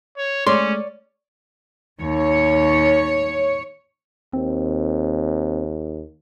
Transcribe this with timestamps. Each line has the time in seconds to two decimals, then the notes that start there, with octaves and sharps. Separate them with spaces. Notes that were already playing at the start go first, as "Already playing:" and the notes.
0.17 C#5
0.47 G#3 A3 C#4 C#5 D5 C6
2.01 D#2 C#5
4.33 D#2 C4